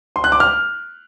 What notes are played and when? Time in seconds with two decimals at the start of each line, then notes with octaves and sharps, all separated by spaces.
0.16 C6
0.24 F#6
0.32 D6
0.40 F6